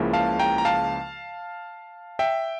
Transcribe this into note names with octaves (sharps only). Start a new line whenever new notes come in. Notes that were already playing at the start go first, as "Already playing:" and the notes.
Already playing: C#2 C#3 F3 A#3 E4
F5 A5
G5 A#5
A#5
F5 A5
E5 G5